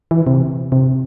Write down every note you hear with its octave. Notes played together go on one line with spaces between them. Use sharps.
E3
C3
C3